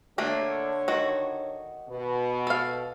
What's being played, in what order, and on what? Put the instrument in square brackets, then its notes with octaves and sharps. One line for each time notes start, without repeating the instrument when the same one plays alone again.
[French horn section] D3 C#5 [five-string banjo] A3 A#3 D4
[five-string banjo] D#3 F#4
[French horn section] B2
[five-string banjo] A4 F5